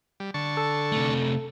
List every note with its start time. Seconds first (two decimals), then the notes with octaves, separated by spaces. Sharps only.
0.20 G3
0.34 D3 A5 C#6
0.57 A4
0.92 C3 A3